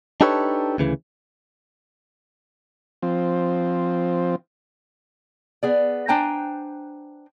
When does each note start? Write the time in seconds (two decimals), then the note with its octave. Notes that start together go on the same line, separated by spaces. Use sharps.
0.21 D4 D#4 G4 A4 B4 C#5
0.78 D2 C#3 E3
3.02 F3 C4
5.63 B3 G#4 D5
6.08 D4 C5 G5 G#5 A#5